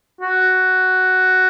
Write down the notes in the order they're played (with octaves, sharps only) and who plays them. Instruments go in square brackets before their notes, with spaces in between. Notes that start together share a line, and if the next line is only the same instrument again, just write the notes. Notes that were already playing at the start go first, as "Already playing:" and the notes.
[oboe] F#4